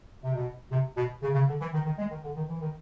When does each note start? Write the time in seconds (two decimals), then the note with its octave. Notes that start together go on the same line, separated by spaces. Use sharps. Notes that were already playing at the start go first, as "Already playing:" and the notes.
0.24 C3
0.33 B2
0.71 C3
0.97 B2
1.23 C#3
1.34 C#3
1.48 D3
1.61 E3
1.74 D#3
1.85 D#3
1.98 G#3
2.11 D#3
2.24 D3
2.36 D#3
2.49 E3
2.62 D#3